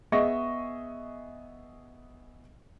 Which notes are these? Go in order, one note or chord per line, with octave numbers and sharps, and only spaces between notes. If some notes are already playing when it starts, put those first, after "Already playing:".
B3 G#4 D#5 E5 C#6 A#6